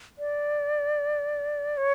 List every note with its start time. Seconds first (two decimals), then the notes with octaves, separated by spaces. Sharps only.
0.19 D5
1.77 C#5